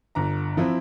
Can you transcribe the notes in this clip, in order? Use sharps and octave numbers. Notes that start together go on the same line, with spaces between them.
G1 A#5
F3 C4 E4